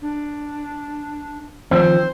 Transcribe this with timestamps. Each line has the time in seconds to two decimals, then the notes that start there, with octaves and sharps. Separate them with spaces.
0.02 D4
1.71 D#3 F3 C4 C5